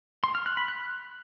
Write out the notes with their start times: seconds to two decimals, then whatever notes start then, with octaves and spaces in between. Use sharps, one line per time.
0.24 C6
0.35 F6
0.46 F#6
0.57 B5
0.68 F#6